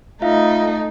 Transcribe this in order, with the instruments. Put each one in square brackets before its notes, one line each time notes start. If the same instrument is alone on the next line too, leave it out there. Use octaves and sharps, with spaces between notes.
[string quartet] A3 D#4 [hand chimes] F4 E5 F5